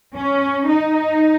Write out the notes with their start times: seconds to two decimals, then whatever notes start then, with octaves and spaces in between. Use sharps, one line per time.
0.15 C#4
0.68 D#4